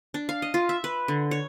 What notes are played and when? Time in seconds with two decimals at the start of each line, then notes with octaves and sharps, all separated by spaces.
0.14 D4
0.29 F5
0.42 D#5
0.54 F4
0.69 E5
0.84 B4
1.08 D3
1.31 C#5